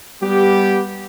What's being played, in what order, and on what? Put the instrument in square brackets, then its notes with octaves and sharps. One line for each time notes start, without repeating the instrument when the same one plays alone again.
[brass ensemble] G3 B3 G4